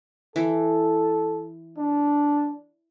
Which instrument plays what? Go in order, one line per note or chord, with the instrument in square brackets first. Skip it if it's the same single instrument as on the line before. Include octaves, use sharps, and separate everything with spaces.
[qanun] E3 [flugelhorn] A4
[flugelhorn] D4